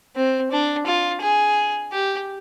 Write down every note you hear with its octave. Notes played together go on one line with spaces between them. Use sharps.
C4
D4
F4
G#4
G4